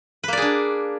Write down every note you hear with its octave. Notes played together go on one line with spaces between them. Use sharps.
A#3 D4 G#4 B4 D5